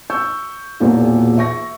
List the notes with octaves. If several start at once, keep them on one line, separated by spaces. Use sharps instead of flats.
C#6 E6 G6
E1 E2 A#2
E5 C#6 A#6